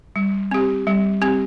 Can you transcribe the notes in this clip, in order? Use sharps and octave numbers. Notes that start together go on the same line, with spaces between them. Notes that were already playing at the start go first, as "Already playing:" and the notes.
G3
C4 G4
G3
C4 G4